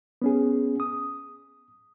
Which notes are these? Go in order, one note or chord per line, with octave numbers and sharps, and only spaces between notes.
B3 C#4 G#4
D#6